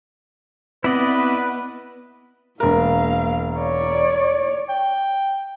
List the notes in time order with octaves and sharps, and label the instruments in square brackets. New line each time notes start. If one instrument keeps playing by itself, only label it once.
[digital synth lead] B3 [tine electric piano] C4 [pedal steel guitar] E4 D5 D#5 [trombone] B4
[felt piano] E1 A#4 [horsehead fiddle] A#3 F5
[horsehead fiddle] C#5 D5
[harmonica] G5